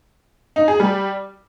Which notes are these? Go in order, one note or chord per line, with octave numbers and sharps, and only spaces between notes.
D#4
G#4
G3